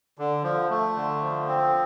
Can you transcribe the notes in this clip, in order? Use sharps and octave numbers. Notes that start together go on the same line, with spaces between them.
D3
F3
A3
D3
F3
C4